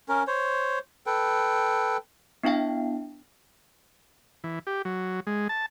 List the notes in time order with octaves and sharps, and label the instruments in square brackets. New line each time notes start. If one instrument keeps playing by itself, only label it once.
[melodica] C#4 A#4
C5 C#5
A4 B4 G5
[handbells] B3 D4 E4 F5 G5
[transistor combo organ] E3
G4
F#3
G#3
A5